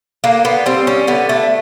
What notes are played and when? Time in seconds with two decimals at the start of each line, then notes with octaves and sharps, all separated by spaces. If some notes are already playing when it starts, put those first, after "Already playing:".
0.24 D3 A#3
0.45 B3
0.66 G3 C4
0.87 C#4
1.07 D3 B3
1.29 A3